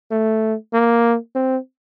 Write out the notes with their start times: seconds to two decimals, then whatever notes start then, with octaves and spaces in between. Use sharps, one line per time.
0.11 A3
0.74 A#3
1.35 C4